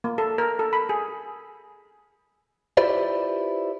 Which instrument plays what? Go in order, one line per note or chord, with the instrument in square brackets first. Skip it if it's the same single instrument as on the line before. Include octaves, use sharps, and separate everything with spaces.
[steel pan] A#3
A4
A#4
A4
B5
G#4
[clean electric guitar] E4 F4 G4 B4 C5 D5